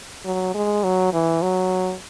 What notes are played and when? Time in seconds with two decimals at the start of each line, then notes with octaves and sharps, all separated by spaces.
0.25 F#3
0.54 G#3
0.84 F#3
1.13 E3
1.42 F#3